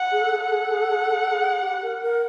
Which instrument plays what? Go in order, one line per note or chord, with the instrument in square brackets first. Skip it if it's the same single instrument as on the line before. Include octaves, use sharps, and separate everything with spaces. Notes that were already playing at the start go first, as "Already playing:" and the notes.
Already playing: [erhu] F#5
[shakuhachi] G#4
A4
G#4
[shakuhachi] A4 [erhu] F#5
[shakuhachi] G#4
A4
G#4
A4
G#4
A4
G#4
A4
G#4
G4
A#4
A#4